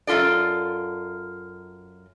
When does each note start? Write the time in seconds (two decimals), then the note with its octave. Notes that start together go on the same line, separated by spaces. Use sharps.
0.07 F#2 C#3 F4 A4 D5